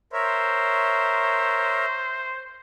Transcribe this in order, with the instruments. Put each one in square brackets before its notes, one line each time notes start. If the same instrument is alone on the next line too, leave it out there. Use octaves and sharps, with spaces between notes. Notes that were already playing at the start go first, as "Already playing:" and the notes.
[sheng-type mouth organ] A#4 C#5 E5 [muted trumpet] C5